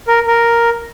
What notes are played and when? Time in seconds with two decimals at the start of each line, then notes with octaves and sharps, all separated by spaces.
0.07 A#4
0.27 A#4